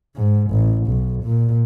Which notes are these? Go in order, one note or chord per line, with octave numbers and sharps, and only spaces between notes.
G#2
A1
B1
A#2